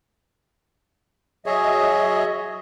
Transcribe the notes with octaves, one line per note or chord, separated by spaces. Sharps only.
F#3 G#4 C#5 D#5 E5